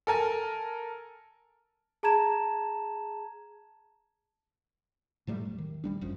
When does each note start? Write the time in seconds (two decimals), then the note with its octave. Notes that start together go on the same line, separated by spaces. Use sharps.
0.07 A4 A#4 G#5 A5
2.03 G#4 A5 A#5 G#6 E7
5.27 A2 F#3 G3 A3
5.45 E1
5.58 D#3
5.84 A#1 G3 D4
6.01 G1 F#2 F3